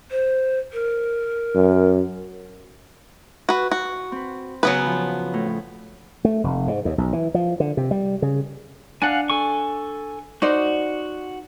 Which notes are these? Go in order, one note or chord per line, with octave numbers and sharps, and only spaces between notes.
C5
A#4
F#2
F#4 B4
F#4
C4 B4
C#3 F#3 B3 B4 G#5 F#6
F3
A2
A3
F1
G#2
D#2
B1
E3
F3
D3
C3
G3
C#3
D4 F5 F#5 G#5
A4 G#5 C#6
D#4 F#4 C5 D5